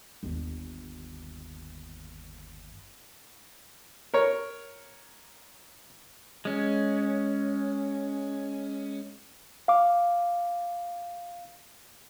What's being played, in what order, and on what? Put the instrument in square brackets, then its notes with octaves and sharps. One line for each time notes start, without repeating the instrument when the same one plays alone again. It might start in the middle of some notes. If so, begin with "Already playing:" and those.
[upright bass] G1 D#2
[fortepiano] A#4 C#5
[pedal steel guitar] G#3 C#4
[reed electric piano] F5 D6